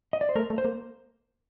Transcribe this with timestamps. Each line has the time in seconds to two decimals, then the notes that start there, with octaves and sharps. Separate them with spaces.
0.13 D#5
0.21 D5
0.29 C5
0.36 A3 A#4
0.50 A3
0.58 C5
0.65 A#3